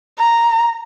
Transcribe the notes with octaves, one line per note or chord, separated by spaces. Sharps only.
A#5